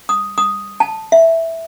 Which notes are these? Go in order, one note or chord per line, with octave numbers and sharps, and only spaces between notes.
D#6
D#6
A5
E5